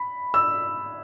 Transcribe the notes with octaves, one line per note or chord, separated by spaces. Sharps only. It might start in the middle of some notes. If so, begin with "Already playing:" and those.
Already playing: B5
E6